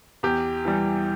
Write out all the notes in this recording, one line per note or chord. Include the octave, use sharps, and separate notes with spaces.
E2 G4
E3 G3